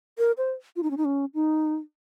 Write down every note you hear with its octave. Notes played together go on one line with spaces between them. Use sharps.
A#4
C5
F4
D#4
C#4
D#4
C#4
D#4